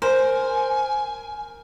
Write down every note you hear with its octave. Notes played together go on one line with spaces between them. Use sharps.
A#4 C5 G#5